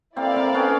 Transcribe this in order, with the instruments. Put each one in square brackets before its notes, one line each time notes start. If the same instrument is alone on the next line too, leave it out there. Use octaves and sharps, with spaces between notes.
[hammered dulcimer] A#3 C4 [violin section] E4 A4 D5 F5
[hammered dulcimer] A#3 C4
B3 C#4